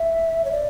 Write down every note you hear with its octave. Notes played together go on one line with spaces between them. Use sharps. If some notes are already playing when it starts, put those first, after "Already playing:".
Already playing: E5
C#5
D5